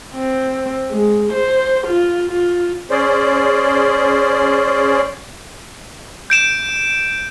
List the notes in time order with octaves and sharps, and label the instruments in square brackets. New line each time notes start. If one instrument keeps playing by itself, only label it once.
[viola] C4
G#3
C5
F4
F4
[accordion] C#4 G#4 C5 D5
[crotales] G6 D7 E7